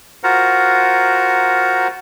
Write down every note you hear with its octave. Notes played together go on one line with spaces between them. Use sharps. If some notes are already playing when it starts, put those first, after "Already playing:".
F4 F#4 A#4 C5 F#5 A#5